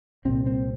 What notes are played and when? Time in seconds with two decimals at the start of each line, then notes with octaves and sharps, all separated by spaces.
0.25 C2 A#2 C4
0.46 C4